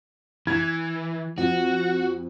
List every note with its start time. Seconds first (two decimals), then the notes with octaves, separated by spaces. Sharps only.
0.47 E3 G#6
1.38 F2 F#4